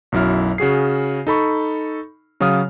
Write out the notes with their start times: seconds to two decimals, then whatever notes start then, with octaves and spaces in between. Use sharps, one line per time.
0.12 B1 F#2 F#3 E4 F6
0.58 C#3 F#4 G#4 C7
1.27 D#4 A4 B5 C#6
2.40 C#3 F#3 C#5 F5 D#6 F6